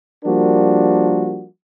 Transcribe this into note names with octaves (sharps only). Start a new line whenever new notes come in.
F3 G3 A#3 D4 F#4 A#4